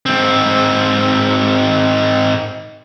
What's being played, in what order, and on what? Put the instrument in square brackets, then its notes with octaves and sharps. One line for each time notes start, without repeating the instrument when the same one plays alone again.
[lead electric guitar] G#2 C4